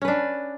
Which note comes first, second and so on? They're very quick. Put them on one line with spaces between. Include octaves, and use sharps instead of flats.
C#4 B4 D4